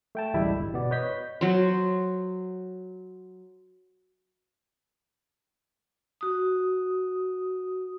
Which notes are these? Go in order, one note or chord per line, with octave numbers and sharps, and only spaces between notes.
A3 G5 A5
A1 D2 G3 G#3 E4 E5
G1
B2 B3 D5
B4 C#5 D#5 G6 B6
F#3 C5
F#4 D#6